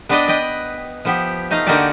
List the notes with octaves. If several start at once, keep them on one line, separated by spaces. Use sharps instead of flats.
B3 D4 B4 D5 D#5 G5
B4 D#5 G5
F3 B3 G4
A3 D#4 D#5 F5
D3 A#3 D#4 F#4 G4 D5